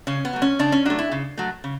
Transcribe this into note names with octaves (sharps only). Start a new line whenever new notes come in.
C#3 C#4
B3
F#3 A3
C#4
C#3 D4
C#4
F#3 A3 D4
E4
C#3
F#3 A3
C#3